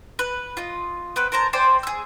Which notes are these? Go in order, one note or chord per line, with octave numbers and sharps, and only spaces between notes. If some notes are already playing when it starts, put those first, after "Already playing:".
B4
F4 D#5
B3 C4 B4
A#4 C5 A5 A#5
C5 D5 G5 G#5
G#4 E6